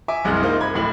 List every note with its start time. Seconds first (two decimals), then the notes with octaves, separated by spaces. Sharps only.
0.08 E5 G#5 D6
0.24 F#1 C2 G#3 F6 F#6
0.43 A#3 D#4 F4 C5
0.61 B5 G#6
0.74 D1 A2 F#7